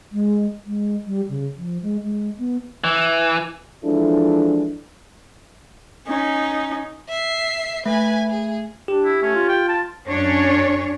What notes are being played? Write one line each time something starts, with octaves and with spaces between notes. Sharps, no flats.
G#3
G#3
G3
C#3
F3
G#3
G#3
B3
E3
E3 F3 G#3 D4 E4 A4
C#4 D#4
E5 C7
A3 B4 G#5
G#4
D4 G4
E4
A3 C#4
F4
G5
A5
F#2 C#4 D4 C#5